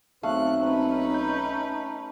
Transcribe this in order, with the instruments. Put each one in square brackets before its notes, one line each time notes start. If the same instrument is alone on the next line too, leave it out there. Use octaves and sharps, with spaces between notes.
[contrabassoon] B1 [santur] A3 [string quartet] C4 F#6 [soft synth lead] F5
[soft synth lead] C4 [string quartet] C#4 D#4 B4
[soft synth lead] G6